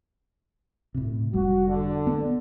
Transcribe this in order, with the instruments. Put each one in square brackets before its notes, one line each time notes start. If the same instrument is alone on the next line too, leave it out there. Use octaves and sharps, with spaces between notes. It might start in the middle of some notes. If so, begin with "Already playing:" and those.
[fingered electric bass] A2 C3
[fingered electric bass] F1 G3 [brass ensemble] F#4
[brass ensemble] D3
[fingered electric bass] B3